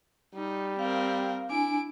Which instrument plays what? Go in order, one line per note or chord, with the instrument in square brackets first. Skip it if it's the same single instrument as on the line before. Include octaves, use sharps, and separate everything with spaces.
[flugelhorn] G3 [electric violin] D#4
[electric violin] C4 A#4 [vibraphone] F5
[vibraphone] D4 G#5 [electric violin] E4 D7